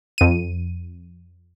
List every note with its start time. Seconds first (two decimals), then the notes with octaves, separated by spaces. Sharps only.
0.18 F2 D#7